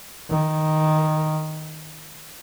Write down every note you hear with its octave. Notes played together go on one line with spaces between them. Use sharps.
D#3